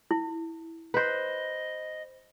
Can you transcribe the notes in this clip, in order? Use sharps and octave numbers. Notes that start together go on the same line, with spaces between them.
E4
B4 C5 D#5